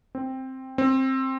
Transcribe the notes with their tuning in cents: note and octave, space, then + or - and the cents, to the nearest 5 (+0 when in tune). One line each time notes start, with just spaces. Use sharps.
C4 +5
C4 +15